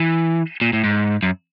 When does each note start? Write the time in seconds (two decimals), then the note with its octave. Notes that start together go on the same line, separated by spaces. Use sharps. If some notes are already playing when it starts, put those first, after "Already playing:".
Already playing: E3
0.61 A#2
0.73 A2
0.84 G#2
1.23 F#2